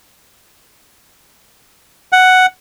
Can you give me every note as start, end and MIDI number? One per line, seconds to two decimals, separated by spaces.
2.13 2.46 78